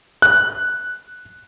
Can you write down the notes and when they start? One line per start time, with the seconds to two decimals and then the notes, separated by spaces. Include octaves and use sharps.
0.22 F#6